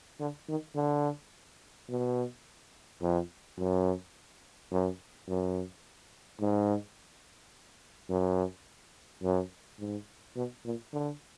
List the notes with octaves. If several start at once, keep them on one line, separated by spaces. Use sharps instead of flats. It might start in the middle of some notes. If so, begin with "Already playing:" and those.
D3
D#3
D3
B2
F2
F#2
F#2
F#2
G#2
F#2
F#2
G#2
B2
A#2
D3